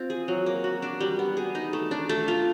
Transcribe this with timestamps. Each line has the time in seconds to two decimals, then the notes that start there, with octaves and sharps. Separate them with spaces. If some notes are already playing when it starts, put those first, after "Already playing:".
Already playing: C4 F4
0.10 G#4
0.28 F#3
0.46 A#3
0.64 F#4
0.82 D4
1.00 G3
1.19 B3
1.37 G#4
1.55 D#4
1.73 A3
1.91 D4
2.09 A3
2.28 F4